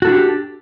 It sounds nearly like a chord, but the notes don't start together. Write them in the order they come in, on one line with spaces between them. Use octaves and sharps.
F#4 A4 E4 D4 G4